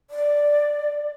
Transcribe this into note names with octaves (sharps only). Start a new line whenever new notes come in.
D5